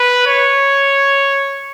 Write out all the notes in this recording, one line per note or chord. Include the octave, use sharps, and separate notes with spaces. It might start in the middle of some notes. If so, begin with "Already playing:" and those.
Already playing: B4
C#5